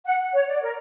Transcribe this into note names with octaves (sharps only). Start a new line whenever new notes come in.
F#5
C#5
D5
A#4